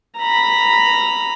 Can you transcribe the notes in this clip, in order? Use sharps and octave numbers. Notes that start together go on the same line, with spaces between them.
A#5 B5